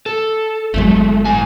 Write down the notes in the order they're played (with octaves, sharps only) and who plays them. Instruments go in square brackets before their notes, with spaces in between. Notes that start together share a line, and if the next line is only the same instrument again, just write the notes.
[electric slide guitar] A4
[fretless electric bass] G1 E2 F#3 [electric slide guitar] G#3 A3
[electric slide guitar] A2 G#5